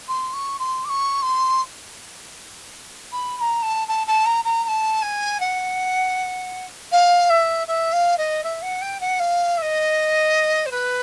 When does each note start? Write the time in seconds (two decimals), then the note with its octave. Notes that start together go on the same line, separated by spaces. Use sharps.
0.08 C6
0.33 C#6
0.59 C6
0.85 D6
0.89 C#6
1.22 C6
3.12 B5
3.37 B5
3.41 A#5
3.62 A5
3.88 A5
4.07 A5
4.26 A#5
4.44 A#5
4.64 A#5
4.68 A5
5.02 G#5
5.40 F#5
6.92 F5
7.30 E5
7.68 E5
7.93 F5
8.18 D#5
8.44 E5
8.62 F#5
8.82 G5
9.00 F#5
9.20 F5
9.57 E5
9.62 D#5
10.66 C5
10.71 B4